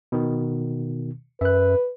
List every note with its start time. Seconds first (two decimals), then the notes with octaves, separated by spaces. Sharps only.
0.12 B2 D#3
1.41 F#2 B4 E5 F#6